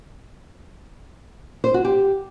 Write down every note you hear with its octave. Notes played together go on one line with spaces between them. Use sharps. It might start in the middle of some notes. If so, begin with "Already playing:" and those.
C5
F#4
G4